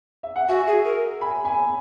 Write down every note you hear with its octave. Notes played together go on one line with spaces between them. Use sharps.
E5
F#5
F#4 E5 G#5
G#4
A#4
G#5 B5
G#5 B5